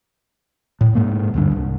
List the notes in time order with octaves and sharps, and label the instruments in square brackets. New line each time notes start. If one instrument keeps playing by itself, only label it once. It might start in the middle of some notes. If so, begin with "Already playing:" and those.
[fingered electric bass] A2
G#2 G#3 A#3
D2 G2 D3
C2